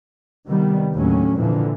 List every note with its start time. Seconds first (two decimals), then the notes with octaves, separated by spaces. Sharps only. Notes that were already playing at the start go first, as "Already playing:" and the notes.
0.48 C3 D#3 G3 B3
0.94 D#2 A2 D3 F#3 C#4
1.36 F2 A#2 D3 E3 F3